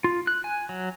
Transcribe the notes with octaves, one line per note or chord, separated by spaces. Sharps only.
F4
F#6
G#5
F#3